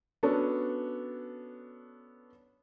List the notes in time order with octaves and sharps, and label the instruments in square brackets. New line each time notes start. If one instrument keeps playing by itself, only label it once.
[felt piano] B3 C#4 D4 F#4 A4 C#5